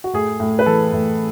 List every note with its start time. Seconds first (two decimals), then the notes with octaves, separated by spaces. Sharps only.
0.04 F#4
0.13 A2 G#4
0.40 A2
0.59 B4
0.66 E3 A4
0.93 A2